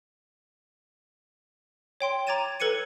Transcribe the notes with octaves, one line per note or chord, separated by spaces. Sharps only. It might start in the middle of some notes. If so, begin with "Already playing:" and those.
C#5 G5 C6
A#5 D6 G#6 A6 D#7 E7
A4 B4 G#6 C#7 D#7